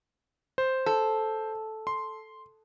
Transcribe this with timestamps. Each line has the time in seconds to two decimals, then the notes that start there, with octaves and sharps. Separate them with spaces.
0.58 C5
0.86 A4
1.87 C6